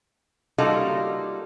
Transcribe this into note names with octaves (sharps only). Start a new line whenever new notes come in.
G3 A#3 D#4 F4 F#4 A4